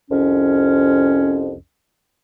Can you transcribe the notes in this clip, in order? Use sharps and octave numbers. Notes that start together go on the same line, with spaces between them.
C2 F2 C#4